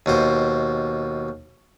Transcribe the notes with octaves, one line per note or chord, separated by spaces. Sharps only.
D#2 B2 C5